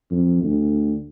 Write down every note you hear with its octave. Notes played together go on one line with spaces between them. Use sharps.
F2
D2